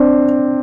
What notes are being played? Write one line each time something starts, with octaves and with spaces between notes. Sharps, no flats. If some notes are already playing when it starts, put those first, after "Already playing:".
Already playing: C4 D4